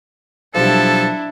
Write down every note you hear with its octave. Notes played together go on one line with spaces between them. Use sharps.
B1 F3 G3 D4 E4 A4